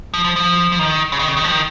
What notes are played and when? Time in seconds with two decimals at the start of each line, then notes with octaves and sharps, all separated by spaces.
0.14 F3
0.24 F3
0.36 F3
0.72 F3
0.79 D#3
1.12 C#3
1.19 D#3
1.28 C#3
1.37 D#3
1.44 F3
1.52 D#3